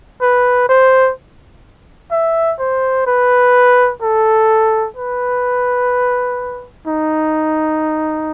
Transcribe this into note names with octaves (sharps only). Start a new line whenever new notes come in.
B4
C5
E5
C5
B4
A4
B4
D#4